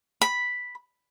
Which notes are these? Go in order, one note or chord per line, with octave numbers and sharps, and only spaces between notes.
B5